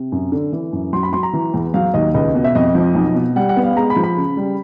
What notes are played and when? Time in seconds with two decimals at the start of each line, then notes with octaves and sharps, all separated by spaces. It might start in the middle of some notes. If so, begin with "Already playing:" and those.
Already playing: C3
0.12 F#2
0.32 D3
0.52 E3
0.73 F#2
0.93 F#3 C6
1.03 B5
1.13 F#3 C6
1.23 A#5
1.33 E3
1.54 E2
1.74 F#3 F5
1.94 D#2 D#5
2.14 C#2 D#5
2.35 B2
2.44 E5
2.55 F2 D#5
2.75 F3
2.95 B1
3.15 B2
3.36 G3 F#5
3.49 F#5
3.57 B3
3.63 F5
3.76 G#3 A#5
3.90 B5
3.96 F3
4.03 B5
4.17 C#3
4.37 G3